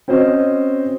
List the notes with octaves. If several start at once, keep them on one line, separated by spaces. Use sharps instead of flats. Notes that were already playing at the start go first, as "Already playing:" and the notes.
C4 C#4 F#4 C5 D#5